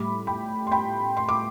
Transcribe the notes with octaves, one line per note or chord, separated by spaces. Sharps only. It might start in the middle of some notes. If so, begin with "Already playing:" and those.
Already playing: A2 G3 B5 D6
G5 B5
C6
G5 B5
C6
D6